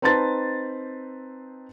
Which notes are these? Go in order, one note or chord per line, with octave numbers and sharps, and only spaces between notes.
C4 D#4 B4 A5 C6 A6